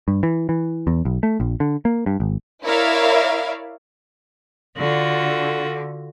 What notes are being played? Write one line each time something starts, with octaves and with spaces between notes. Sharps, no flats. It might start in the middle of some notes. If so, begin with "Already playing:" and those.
G2
E3
E3
E2
B1
A3
A#1
D3
A#3
G2
G#1
E4 A#4 C#5 D5 E5 F5
D3 F4 F#4